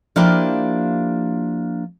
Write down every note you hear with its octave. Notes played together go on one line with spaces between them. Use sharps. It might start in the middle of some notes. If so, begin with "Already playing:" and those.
F3 A#3 D4 E4 F4 G4